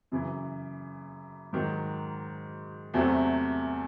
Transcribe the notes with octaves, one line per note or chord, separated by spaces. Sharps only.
F#2 C#3 E3
G#2 D#3 F#3
E2 C3 F#3 A3 C4